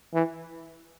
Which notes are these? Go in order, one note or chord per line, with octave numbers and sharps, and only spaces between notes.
E3